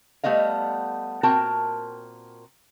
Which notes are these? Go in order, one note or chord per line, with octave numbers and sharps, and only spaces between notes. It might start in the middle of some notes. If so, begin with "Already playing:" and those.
G3 A3 B3 D#5 F5
A#2 C4 F#4 A#4 G5 A5